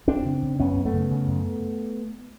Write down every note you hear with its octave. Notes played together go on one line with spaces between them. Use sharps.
F#2 C4 D4
C#3
C#3
F#2 B3 C#4
F#2
A3 B3
C#3
C#3
F#2